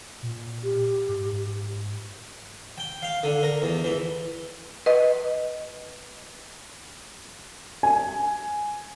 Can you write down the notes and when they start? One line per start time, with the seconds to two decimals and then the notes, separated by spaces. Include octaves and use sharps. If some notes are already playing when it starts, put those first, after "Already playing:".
0.23 A#2
0.63 G4
1.09 G#2
2.78 G5
3.02 F5
3.24 D3
3.43 A#4
3.62 E2
3.84 E3
4.86 B4 D#5
7.83 G#5